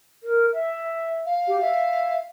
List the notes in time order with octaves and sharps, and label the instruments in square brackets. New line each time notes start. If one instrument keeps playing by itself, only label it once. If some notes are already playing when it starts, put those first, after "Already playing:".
[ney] A#4
E5
[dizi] F5
[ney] G4
E5